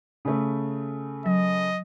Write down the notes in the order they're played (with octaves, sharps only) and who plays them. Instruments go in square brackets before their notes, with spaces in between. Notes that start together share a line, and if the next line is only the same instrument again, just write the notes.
[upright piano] C#3 A3
[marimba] F#3 [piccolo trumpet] D#5